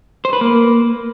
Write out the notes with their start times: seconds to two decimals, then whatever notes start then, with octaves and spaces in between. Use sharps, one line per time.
0.25 C5
0.33 B4
0.41 A#3